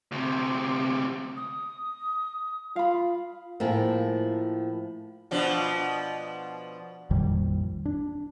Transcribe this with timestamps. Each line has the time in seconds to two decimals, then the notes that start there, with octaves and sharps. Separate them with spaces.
0.12 D2 C3
1.36 D#6
2.76 F4 F5 B5
3.60 A2 F3 A#3 G#4
5.31 B2 F3 D4
7.11 A#1 F2 D#3 G3
7.85 D4